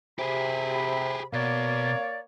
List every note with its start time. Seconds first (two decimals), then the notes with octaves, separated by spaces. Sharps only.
0.19 C3 G4 G#4 B5
1.33 B2 A#3 C#5 D5